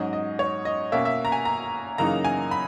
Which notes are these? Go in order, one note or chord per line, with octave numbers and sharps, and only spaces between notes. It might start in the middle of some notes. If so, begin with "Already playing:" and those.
Already playing: G#2 F#3 C#4 D#5
D#5
C#5
D#5
B2 A#3 C#4 E5
E5
A#5
G#5
A#5
F#2 C#3 E3 A#3 D#4 A#5
G#5
B5